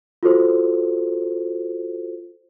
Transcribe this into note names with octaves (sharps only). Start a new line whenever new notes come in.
F4 F#4 A4 C5